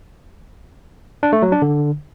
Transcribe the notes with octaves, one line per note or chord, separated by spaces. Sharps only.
D4
A3
F#3
D4
D3